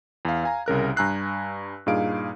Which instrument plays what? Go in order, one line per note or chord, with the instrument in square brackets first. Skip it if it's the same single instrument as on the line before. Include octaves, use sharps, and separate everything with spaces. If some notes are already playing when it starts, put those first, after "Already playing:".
[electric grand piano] E2 F5
F5 G#5 A#5
C2 C#3 A#4 F#6
G2 G#5 A#5 E6 F#6 C7
G2 A#2 D#4 G#4 F5 D7